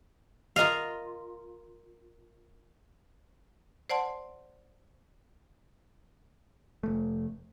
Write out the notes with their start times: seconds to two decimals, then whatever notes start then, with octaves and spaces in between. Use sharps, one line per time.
0.56 F4 A#4 D#5 F5
3.90 C5 D5 F#5 A5 C6
6.83 F1 A3